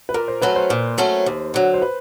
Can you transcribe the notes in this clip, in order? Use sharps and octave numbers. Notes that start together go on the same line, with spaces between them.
B4
A#2 A#4
C5
F#3 A3 C#4 B4
C5
A#2
F#3 A3 C#4
D#2
D3 F#3
C5
B4